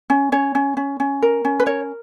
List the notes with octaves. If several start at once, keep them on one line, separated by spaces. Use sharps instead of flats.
C#4
C#4 C#5
C#4
C#4
C#4
A#4
C#4
B4
A#4 C#5